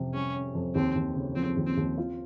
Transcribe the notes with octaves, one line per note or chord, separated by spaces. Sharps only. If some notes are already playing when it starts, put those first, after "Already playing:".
Already playing: F2 C3
G3 C#4
C#4
F2
D#2 C4
D#2
C#3
F3 C4
D#2
C4
D#2
F4